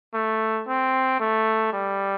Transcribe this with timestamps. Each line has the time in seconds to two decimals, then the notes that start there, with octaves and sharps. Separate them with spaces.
0.14 A3
0.68 C4
1.20 A3
1.73 G3